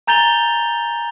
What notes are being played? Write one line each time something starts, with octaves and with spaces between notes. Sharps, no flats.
G#5 A#5 G6 A6 F7 G7